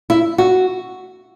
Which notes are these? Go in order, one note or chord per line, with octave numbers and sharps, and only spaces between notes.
E4
F#4